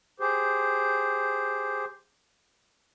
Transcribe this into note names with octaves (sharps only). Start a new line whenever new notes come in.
G4 G#4 C5